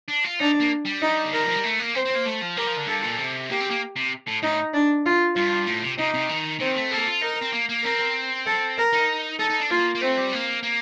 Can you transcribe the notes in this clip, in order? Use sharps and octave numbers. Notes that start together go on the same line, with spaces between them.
D4
F4
D4 D#4
A#3
G3
D#4
D3
D#3 A#4
F3
G3
A3
A#3
C4 C5
C4
A#3
A3
F3
G3 A#4
F3
D3
G2 A4
A#2
C3
A#3 G4
C4
A#3
C3
A2
A2 D#4
D4
F4
G2 F4
A2
C3
C3 D#4
C3
D#3
D#3 C4
A3
A#3 A4
F4
D#4 A#4
C4
A#3
A#3
C4 A#4
A4
A#4
D#4
D#4 A4
D#4
D4
A#3 F4
A#3
A3 C4
G3
A#3
A#3